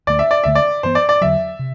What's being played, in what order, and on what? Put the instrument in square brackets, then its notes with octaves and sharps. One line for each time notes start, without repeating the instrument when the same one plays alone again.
[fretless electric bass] D2 D3 A3 [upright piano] D5
[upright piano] E5
D5
[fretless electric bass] D2 D3 A3 [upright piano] E5
[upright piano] D5
[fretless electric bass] G2 E3 B3 [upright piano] C5
[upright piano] D5
D5
[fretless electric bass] E2 D3 F#3 [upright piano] E5
[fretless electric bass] C3